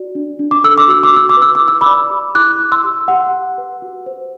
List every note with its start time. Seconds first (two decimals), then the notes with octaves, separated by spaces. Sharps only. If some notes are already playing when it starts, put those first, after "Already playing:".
Already playing: F#4 D5
0.15 D4
0.39 D4
0.51 D6
0.64 A4 E6
0.78 D6
0.88 F#4 E6
1.03 D6
1.13 F#4 E6
1.29 D6
1.37 B4 E6
1.55 D6
1.61 E4
1.68 E6
1.81 D5 B5 D6
2.10 G4
2.35 E4 D6 F#6
2.60 E4
2.72 C6 E6
2.84 G4
3.08 G4 F#5
3.33 G4
3.58 B4
3.82 F#4
4.06 C5